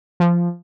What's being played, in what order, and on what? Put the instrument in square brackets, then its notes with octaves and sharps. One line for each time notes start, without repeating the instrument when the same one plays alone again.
[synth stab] F3